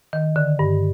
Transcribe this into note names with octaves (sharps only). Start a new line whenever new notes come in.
D#3
D3
G2